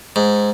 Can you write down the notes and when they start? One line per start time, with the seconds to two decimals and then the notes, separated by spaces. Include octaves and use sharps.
0.16 G#2